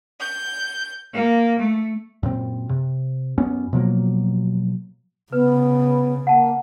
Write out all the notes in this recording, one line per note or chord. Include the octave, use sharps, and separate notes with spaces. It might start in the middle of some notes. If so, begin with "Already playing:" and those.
G6
A#3
A3
F#2 A#2 C4
C3
F#2 B3 C#4
B2 F3 F#3 A#3
C#3 B3 B4
A#3 F#5 A5